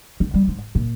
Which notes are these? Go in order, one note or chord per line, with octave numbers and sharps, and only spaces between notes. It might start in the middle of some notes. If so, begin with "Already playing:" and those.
D#3
G3
G#2
A#2